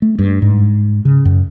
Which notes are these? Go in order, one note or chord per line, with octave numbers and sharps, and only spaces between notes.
A3
G2
G#2
C#3
F#2